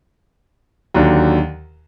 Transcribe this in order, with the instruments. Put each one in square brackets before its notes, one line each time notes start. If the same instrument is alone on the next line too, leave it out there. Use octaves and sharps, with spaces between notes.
[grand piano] D#2 D3 F#3